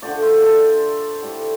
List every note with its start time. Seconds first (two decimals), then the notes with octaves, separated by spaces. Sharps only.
0.02 D3 F3 A3 D5 G5
0.22 C5 F5
0.42 A4 D5
1.22 A2 G3